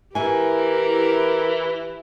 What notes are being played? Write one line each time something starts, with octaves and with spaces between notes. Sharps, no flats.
E3 E4 G4 A#4 G#5